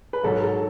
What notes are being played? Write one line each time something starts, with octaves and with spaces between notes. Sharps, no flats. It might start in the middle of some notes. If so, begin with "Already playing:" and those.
B4
G#2 D#3 F#3 A4
A4